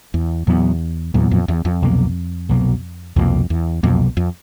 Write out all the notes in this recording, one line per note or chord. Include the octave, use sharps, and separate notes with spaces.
E2
E2 A#2 F#3 B3
E2 A#2 F#3 B3
F2
E2
F2
C2 B2 F#3 A#3
C2 B2 F#3 A#3
C2 F2 B2 F#3 A#3
E2
C2 F2 B2 F#3 A#3
F2